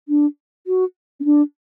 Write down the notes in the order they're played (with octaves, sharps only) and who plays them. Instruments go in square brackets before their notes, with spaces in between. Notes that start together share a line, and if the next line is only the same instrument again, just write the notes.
[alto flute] D4
F#4
C#4
D4